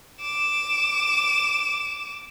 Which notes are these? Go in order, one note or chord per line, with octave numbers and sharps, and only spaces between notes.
D6 E7